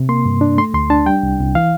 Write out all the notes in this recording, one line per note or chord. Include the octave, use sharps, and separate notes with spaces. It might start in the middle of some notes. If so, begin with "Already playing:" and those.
Already playing: C3
A#3 C6
G2
D4
A3 C6
D2 C6
D4 A5
G3 G5
C2
C2
E3 F5